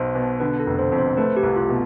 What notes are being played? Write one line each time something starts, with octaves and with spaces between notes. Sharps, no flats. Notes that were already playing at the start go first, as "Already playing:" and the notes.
Already playing: B1 B3 C5
B2
D3 B4
A4
F1
C5
F2
C5
A3 B4
G4
C2
F4
B2